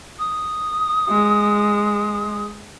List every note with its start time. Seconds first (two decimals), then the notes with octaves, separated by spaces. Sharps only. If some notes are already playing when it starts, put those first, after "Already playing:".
0.19 D#6
1.09 G#3